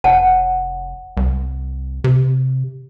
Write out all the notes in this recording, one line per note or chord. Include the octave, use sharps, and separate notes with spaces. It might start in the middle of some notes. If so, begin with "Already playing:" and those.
F1 C#5 F#5 A5
C2
C3